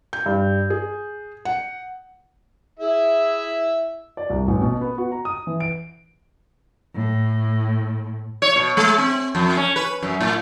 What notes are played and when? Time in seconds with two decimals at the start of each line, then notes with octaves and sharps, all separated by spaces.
0.13 G6
0.26 G2
0.70 G#4
1.45 F#5
2.79 E4 G#4 E5
4.17 D5
4.30 C2
4.48 A1
4.62 B2
4.81 B3
4.98 F#4
5.12 A#5
5.25 D#6
5.47 E3
5.60 D7
6.95 A2
8.42 C#5
8.56 B2
8.77 G#3
8.98 C4
9.35 F2
9.57 C#4
9.76 B4
10.02 F#2
10.21 A2